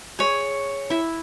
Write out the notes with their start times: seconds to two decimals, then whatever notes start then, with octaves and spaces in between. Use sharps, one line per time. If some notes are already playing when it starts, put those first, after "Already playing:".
0.19 G#4 C#5
0.90 E4 E5